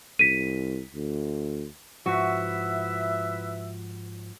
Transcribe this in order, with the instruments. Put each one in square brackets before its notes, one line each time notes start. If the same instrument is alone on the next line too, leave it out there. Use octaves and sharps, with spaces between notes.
[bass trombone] C2 [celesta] B6 D#7
[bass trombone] D2
[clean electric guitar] G#2 F3 [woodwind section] E4 B4 E5 [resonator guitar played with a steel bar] F#4